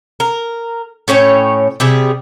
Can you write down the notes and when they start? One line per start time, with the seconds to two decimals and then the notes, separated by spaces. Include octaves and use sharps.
0.20 A#4
1.08 A2 C#4 C#5 G5
1.80 C3 G3 G#4